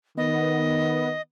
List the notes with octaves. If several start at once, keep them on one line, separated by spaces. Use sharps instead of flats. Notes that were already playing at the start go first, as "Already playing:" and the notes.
D#3 B3 D#5